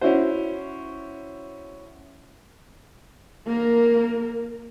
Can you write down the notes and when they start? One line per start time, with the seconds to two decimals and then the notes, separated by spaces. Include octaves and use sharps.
0.01 C#4 E4 F#4 C5
3.46 A#3 A#4